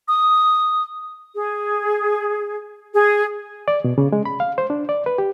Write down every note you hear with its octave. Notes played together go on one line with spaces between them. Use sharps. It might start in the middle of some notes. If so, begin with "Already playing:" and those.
D#6
G#4
G#4
D5
B2
C#3
G#3
B5
F5
C5
D4
D5
B4
G4